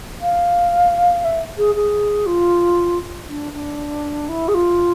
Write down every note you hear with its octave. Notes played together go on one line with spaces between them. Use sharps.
F5
E5
G#4
G#4
F4
D4
D4
E4
G#4
F4